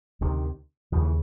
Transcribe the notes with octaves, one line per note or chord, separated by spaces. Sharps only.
D2 C3 D#3
D#2 C#3 F3
E3